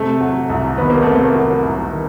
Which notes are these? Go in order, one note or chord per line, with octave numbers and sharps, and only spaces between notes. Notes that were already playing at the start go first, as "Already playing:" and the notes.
Already playing: C3 A3
F#3
C2
D#3 B3
A#3
C3 A3
A#3
F#3
C2
D#3